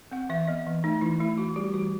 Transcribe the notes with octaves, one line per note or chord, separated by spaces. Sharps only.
C4 F#5
E3 E5
B3 D#5
E3
A3 D#4
E3 E4
A3 E4
E3 F#4
G3 G4
E3 F#4